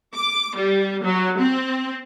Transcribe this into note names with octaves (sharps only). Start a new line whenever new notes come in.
D6
G3
F#3
C4